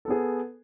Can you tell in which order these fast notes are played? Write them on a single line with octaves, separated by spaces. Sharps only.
A4 B3 G#4